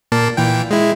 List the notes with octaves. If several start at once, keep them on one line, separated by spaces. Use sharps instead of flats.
A#2 A#3 A5
A#2 E3 G5
G#3 E4